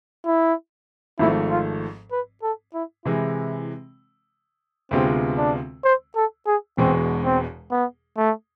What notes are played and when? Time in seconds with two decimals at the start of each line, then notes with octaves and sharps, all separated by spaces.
0.26 E4
1.19 G#1 G#2 F3 A3 E4
1.50 F4
2.12 B4
2.43 A4
2.74 E4
3.05 C3 E3 G#3 E4
4.91 D2 C3 G#3 B3 C4 F4
5.38 D4
5.84 C5
6.16 A4
6.47 G#4
6.77 E1 E2 B2 G#3 C4
7.24 C4
7.71 B3
8.17 A3